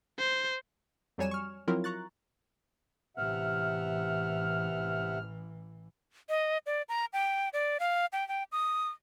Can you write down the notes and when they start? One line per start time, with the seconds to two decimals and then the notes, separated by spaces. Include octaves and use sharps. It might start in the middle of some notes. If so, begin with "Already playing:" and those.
0.19 C5
1.18 F2 F#3 G3 C#5 G#5 E7
1.31 C#6 F6
1.68 F3 F#3 C4 E4 F4 A#4
1.84 A#5 C#6 F#6 A6
3.17 A1 C3 E3 E5 F#5 F6
6.29 D#5
6.66 D5
6.89 A#5
7.13 G5
7.53 D5
7.80 F5
8.13 G5
8.28 G5
8.52 D#6